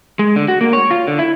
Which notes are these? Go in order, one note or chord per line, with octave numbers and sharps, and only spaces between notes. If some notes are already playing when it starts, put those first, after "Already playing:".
G#3
D3
F#4
A#3
C#5
F4
D3
E4